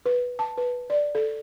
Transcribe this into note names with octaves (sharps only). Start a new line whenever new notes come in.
B4
A5
B4
D5
A4